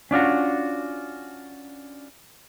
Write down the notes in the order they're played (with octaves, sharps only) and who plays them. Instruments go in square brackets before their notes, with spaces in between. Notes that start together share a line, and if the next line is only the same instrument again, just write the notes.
[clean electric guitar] C#4 D4 F4 F#4